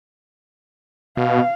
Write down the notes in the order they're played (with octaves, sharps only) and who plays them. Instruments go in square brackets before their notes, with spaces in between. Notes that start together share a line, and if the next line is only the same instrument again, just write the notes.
[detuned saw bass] B2 [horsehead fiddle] F5